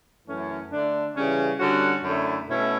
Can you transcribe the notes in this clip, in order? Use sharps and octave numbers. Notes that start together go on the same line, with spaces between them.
F#2 E3 A3 C#4
D3 A3 D4
C#3 E3 G3 C#4
D3 G3 C#4 F#4
F#2 D3 A3 E4
B2 A3 C#4 E4